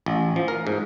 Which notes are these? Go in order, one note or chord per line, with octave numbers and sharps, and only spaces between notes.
A1
F3
A#4
G#2